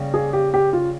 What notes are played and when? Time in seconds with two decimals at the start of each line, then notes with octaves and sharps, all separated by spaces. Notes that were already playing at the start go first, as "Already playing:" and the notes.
Already playing: C#3 G3 A#3
0.14 G#4
0.33 G4
0.54 G4
0.73 F4